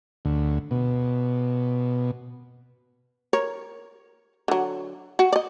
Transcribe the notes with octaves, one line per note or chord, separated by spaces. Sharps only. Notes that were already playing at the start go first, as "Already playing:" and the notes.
D2
B2
A#4 C#5
D3 F#3
F#4
D5 D#5